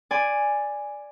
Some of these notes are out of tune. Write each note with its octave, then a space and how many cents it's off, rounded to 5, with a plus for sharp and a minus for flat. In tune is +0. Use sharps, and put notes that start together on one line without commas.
D5 +0 G#5 -5 B5 +45